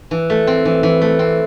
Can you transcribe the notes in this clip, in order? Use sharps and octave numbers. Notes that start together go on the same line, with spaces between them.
E3
A3
C4
E3
E3
A3
C4